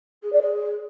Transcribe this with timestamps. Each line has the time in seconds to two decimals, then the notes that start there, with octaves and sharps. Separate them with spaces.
0.22 G#4
0.32 D5
0.42 G#4